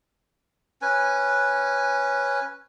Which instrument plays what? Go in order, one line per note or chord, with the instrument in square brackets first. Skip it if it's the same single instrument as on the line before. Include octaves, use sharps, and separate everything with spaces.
[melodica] C#4 B4 G#5